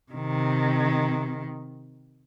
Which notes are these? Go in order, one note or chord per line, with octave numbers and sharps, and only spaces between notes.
C3 D#3